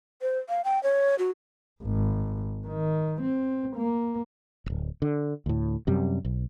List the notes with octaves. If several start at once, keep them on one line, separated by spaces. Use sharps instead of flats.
C5
F5
G5
C#5
F#4
G#1
D#3
C4
A#3
D1 G1
D3
D2 A2
F#2 C3 G3
B1